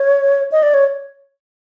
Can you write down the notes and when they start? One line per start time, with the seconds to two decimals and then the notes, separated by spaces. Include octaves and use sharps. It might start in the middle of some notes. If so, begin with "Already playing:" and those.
Already playing: C#5
0.52 D#5
0.63 D5
0.74 C#5